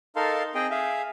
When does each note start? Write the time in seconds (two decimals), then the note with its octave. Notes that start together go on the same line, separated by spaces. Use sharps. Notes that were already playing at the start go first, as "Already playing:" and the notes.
0.16 D#4 A4 A#4 F5 A5 C6
0.55 C4 G#4 C5 D#5 G5
0.71 G#4 E5 F5